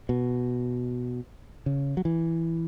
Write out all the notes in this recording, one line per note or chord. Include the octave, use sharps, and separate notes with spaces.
B2
C#3
F#3
E3